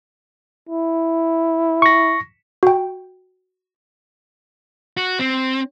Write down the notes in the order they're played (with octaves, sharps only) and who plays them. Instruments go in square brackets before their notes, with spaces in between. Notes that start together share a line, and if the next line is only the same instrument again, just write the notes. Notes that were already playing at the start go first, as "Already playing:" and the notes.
[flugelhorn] E4
[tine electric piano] C#6 A#6
[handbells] F#4 G5
[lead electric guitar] F#4
C4